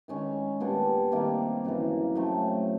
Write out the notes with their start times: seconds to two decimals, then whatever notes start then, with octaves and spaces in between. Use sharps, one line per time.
0.08 D#3 G#3 C#4
0.60 A#2 G3 B3 D4
1.12 C3 D#3 G3 A#3
1.64 F#2 C#3 E3
2.15 C#3 F#3 A3 C4